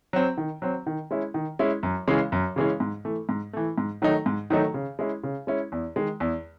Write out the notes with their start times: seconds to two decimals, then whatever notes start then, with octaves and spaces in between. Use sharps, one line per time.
0.13 F#3 C4
0.38 D#3
0.62 F#3 C4
0.87 D#3
1.11 G#3 C#4 E4
1.34 D#3
1.59 G#3 C#4 E4
1.83 F#2
2.08 C#3 E3 G#3 C#4
2.32 F#2
2.56 C#3 E3 G#3 C#4
2.80 G#2
3.05 E3 A3
3.29 G#2
3.53 E3 A3
3.78 G#2
4.02 D#3 F#3 A3 D#4
4.26 G#2
4.50 D#3 F#3 A3 D#4
4.74 C#3
4.99 G#3 C#4 E4
5.24 C#3
5.47 G#3 C#4 E4
5.72 E2
5.96 D#3 G#3
6.20 E2